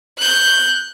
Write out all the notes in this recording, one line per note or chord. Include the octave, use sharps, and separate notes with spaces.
F#6 G6